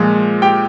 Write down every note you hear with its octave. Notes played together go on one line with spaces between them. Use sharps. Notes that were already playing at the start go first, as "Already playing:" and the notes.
Already playing: A#2 F3 G#3
G4 G5